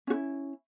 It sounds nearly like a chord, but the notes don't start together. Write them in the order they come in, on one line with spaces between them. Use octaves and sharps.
C#4 F#4 E4